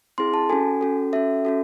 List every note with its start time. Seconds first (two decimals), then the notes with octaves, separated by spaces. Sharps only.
0.18 C4 E4 G#4 C6
0.34 A5
0.49 C#4 F#4 A4 G#5
0.81 C#4 F#4 A4
1.13 C#4 F#4 A4 E5
1.45 C#4 F#4 A4